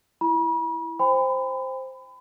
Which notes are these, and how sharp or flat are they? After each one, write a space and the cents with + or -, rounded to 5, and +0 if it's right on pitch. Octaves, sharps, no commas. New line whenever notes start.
E4 +5 B5 -45
C5 +0 G5 +40 B5 +35